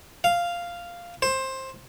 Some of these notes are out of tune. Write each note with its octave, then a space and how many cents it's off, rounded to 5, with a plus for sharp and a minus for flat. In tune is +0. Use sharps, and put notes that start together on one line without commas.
F5 -5
C5 +15